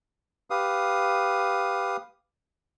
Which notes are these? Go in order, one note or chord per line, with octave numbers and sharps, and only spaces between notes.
G4 B4 F5 D#6